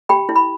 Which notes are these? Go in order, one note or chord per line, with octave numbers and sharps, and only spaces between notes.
G4 G5 B5
E4
B5